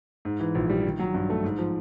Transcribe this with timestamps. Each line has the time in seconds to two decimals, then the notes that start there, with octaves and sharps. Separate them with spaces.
0.25 G#2
0.40 E3
0.55 A#1
0.70 G3
0.85 D#3
0.99 F#3
1.14 G2
1.30 A3
1.44 G#2
1.58 F3